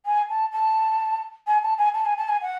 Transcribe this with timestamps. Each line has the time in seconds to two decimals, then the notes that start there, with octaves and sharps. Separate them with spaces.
0.05 G#5
0.29 A5
0.52 A5
1.47 G#5
1.62 A5
1.78 G#5
1.94 A5
2.05 G#5
2.17 A5
2.28 G#5
2.41 F#5